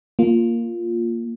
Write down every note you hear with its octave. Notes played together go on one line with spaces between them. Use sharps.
A#3 F4